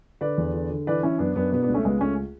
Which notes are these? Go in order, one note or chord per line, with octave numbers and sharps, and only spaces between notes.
D3 B4 D5
E2
D3
D3
E3 B4 D5
E3 C#4 E4
F#2 B3 D4
F#2 B3 D4
B2 B3 D4
B3 D4
C#2
A3 C#4
C#2 G#3 B3
C#2 A3 C#4